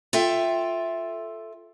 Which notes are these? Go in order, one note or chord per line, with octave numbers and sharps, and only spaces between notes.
F4 A4 E5 G5